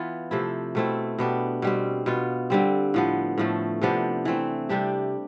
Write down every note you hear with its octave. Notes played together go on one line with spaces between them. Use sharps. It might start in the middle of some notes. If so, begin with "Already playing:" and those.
Already playing: E3 B3 F4
C3 F3 A3 E4
B2 A3 C4 E4
B2 B3 D4 G4
B2 G3 C4
B2 B3 F4
D3 G3 C4
A2 F3 B3
A2 F3 A3
C3 F3 B3 D4
E3 A3 C4
C3 G3 D4 G4